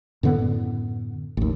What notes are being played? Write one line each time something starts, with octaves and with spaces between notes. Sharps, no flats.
F#2 A2 D3 B3
A1 D#2